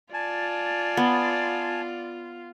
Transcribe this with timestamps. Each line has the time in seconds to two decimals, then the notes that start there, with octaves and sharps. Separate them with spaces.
0.13 F4 D5 G#5 A5
0.97 B3